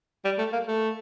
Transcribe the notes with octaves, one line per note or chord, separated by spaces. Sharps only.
G3
A3
A#3
A3